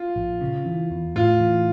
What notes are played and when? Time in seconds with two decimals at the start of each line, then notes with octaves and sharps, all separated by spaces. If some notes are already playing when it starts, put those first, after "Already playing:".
Already playing: F4
0.16 A#1
0.41 C#3
0.66 E3
0.91 E2
1.15 A2 F4
1.40 E3